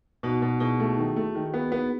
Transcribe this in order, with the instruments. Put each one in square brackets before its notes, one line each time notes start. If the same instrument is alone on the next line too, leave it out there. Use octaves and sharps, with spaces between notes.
[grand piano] B2 [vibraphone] D#4 F#4
[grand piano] B2
[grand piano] B2 [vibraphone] E4 G#4
[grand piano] A3
D#3
A3
D#3
B3
B3